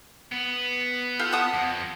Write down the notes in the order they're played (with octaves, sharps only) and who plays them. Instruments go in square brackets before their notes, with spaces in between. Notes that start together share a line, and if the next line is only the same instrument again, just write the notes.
[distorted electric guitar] B3
[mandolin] F4 G4 A4
F#5 A5 D#6
[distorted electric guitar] F2